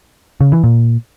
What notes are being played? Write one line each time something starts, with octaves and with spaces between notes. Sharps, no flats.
C#3
E3
A#2